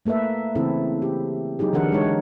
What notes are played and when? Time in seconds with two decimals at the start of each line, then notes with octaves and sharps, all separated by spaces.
0.06 A3 A#3 A4 B4 E5
0.55 C#3 E3 C4 E4 A4
1.02 G4
1.59 F#3 D#4 G4 G#4
1.73 D3 E3 D4 A4 A#4 F#5
1.92 G#3 D#4 C#5